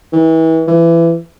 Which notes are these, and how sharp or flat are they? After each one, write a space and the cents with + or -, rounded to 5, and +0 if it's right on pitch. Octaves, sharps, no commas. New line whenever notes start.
E3 -30
E3 +25